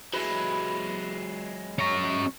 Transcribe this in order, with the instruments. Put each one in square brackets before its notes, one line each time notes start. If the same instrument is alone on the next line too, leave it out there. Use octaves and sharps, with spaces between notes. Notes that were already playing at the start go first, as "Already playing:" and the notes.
[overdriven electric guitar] F#3 G#3 [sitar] E4 B4
[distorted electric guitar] C#4 A#5 [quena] C#6